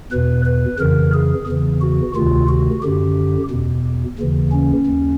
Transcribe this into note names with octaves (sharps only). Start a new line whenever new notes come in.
E2 B2 B4
B4
F2 C#3 E3 A#4
G#4
E2 C#3 E3
F#4
D2 C3 D#3 F4
F#4
F#2 D3 G4
E2 B2
D#2 C#3 E3
C#4
D#2